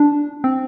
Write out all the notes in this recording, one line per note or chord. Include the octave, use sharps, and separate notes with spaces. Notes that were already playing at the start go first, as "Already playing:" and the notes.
Already playing: D4
C4